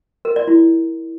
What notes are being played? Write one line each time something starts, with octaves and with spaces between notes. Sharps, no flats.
A#4
D5
E4